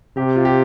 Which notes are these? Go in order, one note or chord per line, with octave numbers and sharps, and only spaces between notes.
C3 G4
F4
G4